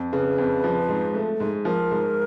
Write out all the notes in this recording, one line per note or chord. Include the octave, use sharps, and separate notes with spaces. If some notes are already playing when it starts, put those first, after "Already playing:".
Already playing: F2
C#3 B4
F2
F3
G#2
A3
G#2
F3 A#4
G#2